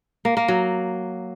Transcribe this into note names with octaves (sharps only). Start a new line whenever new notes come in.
A#3
A#3
F#3